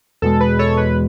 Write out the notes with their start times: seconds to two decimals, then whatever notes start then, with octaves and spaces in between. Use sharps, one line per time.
0.22 E2 B2 G#3 A4
0.40 B4
0.59 A4 C#5
0.77 B4